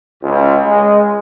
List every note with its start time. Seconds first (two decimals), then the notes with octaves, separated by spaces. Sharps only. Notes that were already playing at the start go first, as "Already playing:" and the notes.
0.23 C#2
0.66 G#3